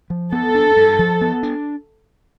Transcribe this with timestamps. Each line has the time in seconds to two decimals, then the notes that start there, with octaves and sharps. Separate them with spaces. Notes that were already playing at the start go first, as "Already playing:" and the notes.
0.10 F3
0.32 B3 A4
0.55 D4
0.77 G2
0.99 F3
1.21 B3
1.43 D4